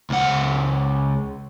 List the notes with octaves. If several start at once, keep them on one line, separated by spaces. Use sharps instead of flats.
C#2 F#5